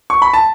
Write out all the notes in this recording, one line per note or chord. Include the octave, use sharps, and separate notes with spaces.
C#6
B5
A5